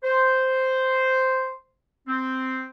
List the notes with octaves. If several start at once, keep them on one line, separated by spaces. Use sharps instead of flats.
C5
C4